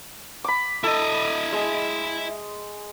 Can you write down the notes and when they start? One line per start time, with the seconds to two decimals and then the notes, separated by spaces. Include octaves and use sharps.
0.44 B5 D6
0.84 E4 A4 D#5
1.52 G#3